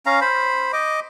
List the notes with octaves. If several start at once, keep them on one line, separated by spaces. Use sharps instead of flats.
C#4 F5 A#5
C5 B5
D#5 D6